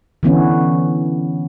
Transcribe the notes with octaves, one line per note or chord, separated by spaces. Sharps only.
D3 E3 B3 C#4